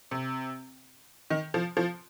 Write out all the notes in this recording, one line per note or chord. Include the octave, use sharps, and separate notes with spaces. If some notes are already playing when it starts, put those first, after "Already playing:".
C3
D#3
F3
F3